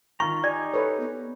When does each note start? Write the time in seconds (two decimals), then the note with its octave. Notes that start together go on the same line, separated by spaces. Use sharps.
0.20 D#3 F4 A#5 C#6
0.44 D#4 G4 D5 G#5
0.74 A4 B4 C#5
1.00 B3